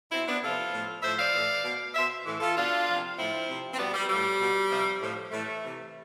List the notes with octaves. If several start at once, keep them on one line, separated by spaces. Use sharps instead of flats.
B2 C4 E4
B3 D4
C3 F3 F4 A4
A2 F3
A2 F3 C5 E5
D5 F5
A2 E3
B2
B2 C5 E5
A2 E3
F4 A4
B2 D4 F4
C3 F3
A2 F3 C4 E4
C3 F3
C4
B2 G3 B3
G3
A2 F3 G3
B2
C3 F3
A2 F3
A2 E3 A3
C3 E3